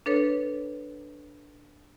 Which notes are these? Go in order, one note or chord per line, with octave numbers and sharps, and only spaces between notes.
D4 A4 B4 C#5